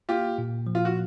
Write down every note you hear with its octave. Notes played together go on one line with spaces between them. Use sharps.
A#3 F4 G4
A#2
F3
F4
F#4